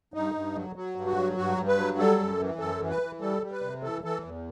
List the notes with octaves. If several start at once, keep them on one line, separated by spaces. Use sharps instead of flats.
G2 D#4
G2
F#3
F#3
G2
F#4
F#3
G2 F#4
G2
B4
F#3
G3 A4
F#2
E3
F#2 A4
E3
B4
E3
G3 A4
G3
B4
C3
E3 A4
E3 A4
E2